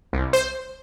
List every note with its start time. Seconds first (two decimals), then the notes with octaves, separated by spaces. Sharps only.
0.13 C2
0.33 C5